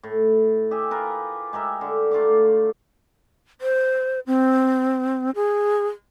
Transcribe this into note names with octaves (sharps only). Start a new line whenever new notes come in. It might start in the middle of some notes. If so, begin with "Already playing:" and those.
A2
G4 G#4 E5
F4 A#4 B4
G#3 G4 A#4 E5
D3
A3 F4 F5 D6
C5
C4
G#4